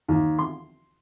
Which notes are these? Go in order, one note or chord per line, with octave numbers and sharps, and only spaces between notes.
D#2
C6